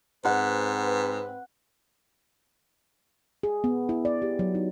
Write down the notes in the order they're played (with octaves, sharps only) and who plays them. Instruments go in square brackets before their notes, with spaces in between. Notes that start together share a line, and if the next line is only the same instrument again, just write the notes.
[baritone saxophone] G#2 [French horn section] C4 B4 [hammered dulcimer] F#5
[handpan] G#4
B3
E4
D5
G4
F#3
D#4